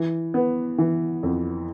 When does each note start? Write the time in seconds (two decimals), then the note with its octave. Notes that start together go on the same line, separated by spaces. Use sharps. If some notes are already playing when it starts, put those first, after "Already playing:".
Already playing: E3
0.34 B3
0.78 E3
1.23 F2